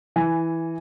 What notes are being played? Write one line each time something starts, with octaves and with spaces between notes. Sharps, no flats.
E3 G#5